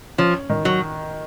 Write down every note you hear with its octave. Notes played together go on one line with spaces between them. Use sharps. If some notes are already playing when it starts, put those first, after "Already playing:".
F3 C#4
D#3
F#3